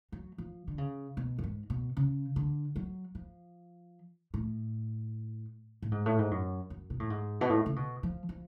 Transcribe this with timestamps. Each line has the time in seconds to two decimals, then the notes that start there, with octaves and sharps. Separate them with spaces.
0.12 F#3
0.38 F3
0.68 D3
0.78 C#3
1.17 B2
1.38 F#2
1.43 G#2
1.70 B2
1.97 C#3
2.36 D3
2.76 F#3
3.15 F3
4.34 A2
5.82 A2
5.92 G#2
6.06 A2
6.19 G#2
6.31 F#2
6.70 F#2
6.90 B2
7.00 A2
7.10 G#2
7.41 B2
7.50 A2
7.66 C#3
7.76 B2
8.03 F3
8.29 F3